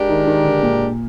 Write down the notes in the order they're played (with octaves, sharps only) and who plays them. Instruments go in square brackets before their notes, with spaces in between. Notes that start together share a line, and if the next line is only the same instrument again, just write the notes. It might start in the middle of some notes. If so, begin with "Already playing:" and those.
Already playing: [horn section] G#3 D4 G4 A#4
[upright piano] D#3
D#3
D3
A#2